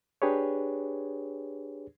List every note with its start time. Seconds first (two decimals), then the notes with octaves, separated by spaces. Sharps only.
0.22 D4 G4 G#4 B4 C#5